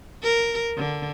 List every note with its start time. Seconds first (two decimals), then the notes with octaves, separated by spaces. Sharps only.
0.23 A#4
0.77 D3